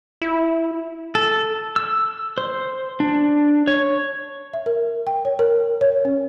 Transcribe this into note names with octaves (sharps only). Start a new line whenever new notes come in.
E4
A4
E6
C5
D4
C#5
E5
A#4
G5
C#5
A#4
C#5
C#4